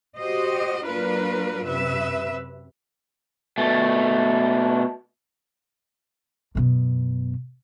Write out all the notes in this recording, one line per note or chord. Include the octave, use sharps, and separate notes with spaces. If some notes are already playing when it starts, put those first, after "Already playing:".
F#4 G4 C5 D#5
F#3 A#3 D4 F4 A#4 B4
F#2 C3 B4 E5
B2 A3
F#2 B2